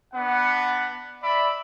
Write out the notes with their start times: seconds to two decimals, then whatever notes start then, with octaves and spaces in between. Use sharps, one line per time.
0.14 B3 D4 F#5
1.22 D5 E5 B5